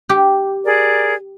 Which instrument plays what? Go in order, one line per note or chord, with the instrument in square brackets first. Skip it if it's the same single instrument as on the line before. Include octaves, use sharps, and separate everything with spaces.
[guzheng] G4
[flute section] G#4 A#4 D5